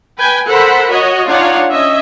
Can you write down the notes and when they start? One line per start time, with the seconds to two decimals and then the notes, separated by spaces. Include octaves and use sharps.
0.19 B4 G5 G#5
0.47 A4 A#4 C5 F#5 B5
0.89 F#4 C#5 D#5
1.28 D4 D#4 F4 C#5 F5 F#5
1.70 C#4 D#5 E5